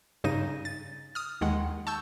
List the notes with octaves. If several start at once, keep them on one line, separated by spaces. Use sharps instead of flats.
G2 C#3 D#4 A#6 D#7
A6
D#6 F6
D#2 D#3 G#3 F#5
A5 C#6 E6 G6